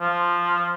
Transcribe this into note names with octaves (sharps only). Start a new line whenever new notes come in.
F3